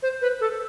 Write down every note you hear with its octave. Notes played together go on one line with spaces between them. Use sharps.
C5
B4
A4